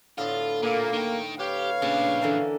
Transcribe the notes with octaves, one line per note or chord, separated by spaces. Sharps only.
A2 D3 B3 F4
A#2 A#3
D#3 G5
G4 B4 C#5 F5
A#2 C#3 D4
D3 E3 A#3